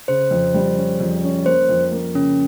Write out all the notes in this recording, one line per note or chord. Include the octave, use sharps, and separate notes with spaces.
C#3 C5
F2
G3
C#4
F2
C#4
A#3 C5
F2
A#3
C#3 C#4